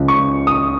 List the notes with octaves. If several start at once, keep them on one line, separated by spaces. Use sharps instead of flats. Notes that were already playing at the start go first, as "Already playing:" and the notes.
Already playing: C#2 C#3 F3
C#6
D#6